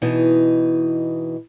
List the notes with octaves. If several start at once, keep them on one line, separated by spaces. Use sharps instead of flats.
B2 E3 D#4